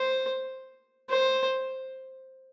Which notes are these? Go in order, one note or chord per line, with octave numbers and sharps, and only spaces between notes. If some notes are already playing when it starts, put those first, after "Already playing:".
Already playing: C5
C5